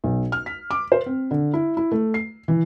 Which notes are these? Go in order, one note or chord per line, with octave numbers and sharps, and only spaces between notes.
B1
F6
B6
D6
C5
C4
D3
E4
E4
A3
C7
E3